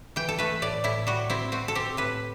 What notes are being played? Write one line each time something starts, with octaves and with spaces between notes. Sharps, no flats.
E3 G5
A4
A3 B4
A2 D5
A2 E4
G3 F#4
C4 E4
C4 F#4
A4
C4 G4
A2 B4